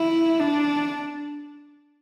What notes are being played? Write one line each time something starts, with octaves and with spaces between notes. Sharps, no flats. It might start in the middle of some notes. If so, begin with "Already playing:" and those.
Already playing: E4
D4